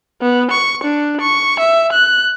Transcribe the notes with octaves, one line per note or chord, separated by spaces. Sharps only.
B3
C#6
D4
C#6
E5
F#6